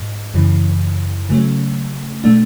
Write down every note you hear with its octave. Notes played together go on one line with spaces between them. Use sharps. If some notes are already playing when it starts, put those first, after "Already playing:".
Already playing: G#2
F#2 C#3 E3
C#3 F#3 A3 C#4
B2 A3 D4